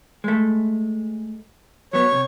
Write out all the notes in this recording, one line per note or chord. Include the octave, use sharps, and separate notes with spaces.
G#3 A3
F#3 B3 C#5
C3